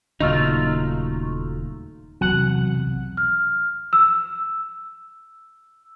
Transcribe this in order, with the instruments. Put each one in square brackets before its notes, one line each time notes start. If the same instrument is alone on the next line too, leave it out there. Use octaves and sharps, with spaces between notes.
[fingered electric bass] D#1 C#3 A#3 [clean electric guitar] F#3 A3 F4 [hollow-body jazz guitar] D#4
[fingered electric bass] B1 E2 C3 [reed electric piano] F#3 [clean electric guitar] F#5
[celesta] F6
E6